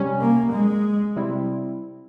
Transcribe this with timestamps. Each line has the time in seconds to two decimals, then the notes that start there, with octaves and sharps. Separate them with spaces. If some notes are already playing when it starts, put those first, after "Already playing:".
Already playing: C3 G3 C#4
0.21 A#3
0.52 G#3
1.16 C3 G3 C4 E4